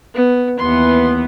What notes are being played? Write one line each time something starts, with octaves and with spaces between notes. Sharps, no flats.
B3
D#2 E3 B3 C6